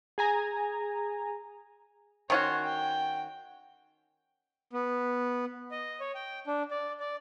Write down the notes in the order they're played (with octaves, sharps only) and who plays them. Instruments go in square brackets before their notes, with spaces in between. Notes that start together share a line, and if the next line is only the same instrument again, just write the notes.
[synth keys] G#4 G#5 A#5
[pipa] D#3 C#4 F#4 [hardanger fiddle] C#5 C6
[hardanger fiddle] G5
[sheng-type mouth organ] B3
D#5
C#5
G5
D4
D5
D5